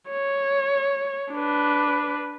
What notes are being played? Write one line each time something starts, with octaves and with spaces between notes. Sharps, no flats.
C#5
D4 B4